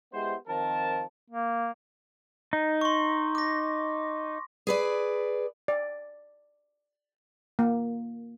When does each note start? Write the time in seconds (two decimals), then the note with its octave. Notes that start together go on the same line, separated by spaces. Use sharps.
0.13 G#3 B3 E4 G4 C5
0.48 D#3 F3 C4 F4 A#4 A5
1.30 A#3
2.53 D#4
2.81 C6 C#6
3.35 D6 A#6
4.67 G#4 B4 D5
5.68 D5
7.59 A#3